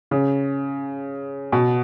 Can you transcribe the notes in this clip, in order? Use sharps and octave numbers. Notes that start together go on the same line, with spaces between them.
C#3
B2